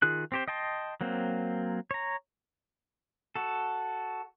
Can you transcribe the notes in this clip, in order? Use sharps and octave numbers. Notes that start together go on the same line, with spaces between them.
D#3 F4 G#4 F#6
C4 G4 C5
D#5 G5 A5 C6
F#3 A#3 C4
C#5 A#5
F#4 A4